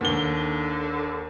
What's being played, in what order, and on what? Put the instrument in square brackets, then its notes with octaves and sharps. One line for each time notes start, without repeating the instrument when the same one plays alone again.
[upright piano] D#2 G7 [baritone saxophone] D3